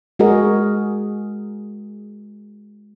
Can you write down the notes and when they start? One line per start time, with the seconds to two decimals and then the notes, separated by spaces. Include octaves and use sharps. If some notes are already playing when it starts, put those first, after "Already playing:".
0.19 G#3 F#4 G#4 A#4 D#5